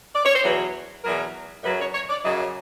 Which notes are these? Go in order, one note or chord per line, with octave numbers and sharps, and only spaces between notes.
D5
C#5
C5
E2 B2 F#3 B4
E2 B2 F#3 A#4
F#2 C#3 F#3 B4
C#5
C#5
D5
F#2 C#3 F#3 D#5